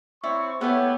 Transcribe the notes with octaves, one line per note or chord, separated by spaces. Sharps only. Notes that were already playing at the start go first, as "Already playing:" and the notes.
C4 E4 C#5 D5 C#6
B3 E4 G4 A4 C#5 F#5